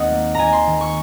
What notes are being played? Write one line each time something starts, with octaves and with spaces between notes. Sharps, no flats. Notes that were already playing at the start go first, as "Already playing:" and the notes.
Already playing: D#2 C4 D#5 F#5
A#3
D#2 G#5 A#5
C6
D#3
C#6